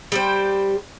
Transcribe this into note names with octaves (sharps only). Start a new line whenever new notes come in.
G3 G4 C5